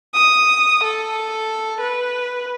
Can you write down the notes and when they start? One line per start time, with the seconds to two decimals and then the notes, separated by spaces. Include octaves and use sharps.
0.14 D#6
0.83 A4
1.80 B4